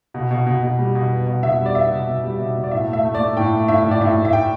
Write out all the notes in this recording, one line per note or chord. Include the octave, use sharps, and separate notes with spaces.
B2
B2
B2
B2
G3
B2
B3
B2
B2 E5
G3
D5
B3 E5
B2
B2
G3
B2
B2
D5
A2 E5
A3
E5
A3
D5
A3
A2 G5
A3
A2 E5
A2
D5
A2 E5
A2
E5
A2 G5